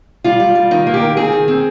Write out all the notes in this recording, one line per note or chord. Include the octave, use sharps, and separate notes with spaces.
G3 F4
G3
G3
D#3 D#4
A#3
G4
D#3
C4 G#4
D#3
C4